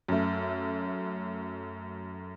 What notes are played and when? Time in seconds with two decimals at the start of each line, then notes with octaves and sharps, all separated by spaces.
0.08 F#2 A3